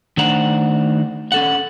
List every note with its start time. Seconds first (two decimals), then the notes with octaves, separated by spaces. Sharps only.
0.17 D#3 A3 D4 C5 F#5 A#5
1.32 C#4 A4 F#5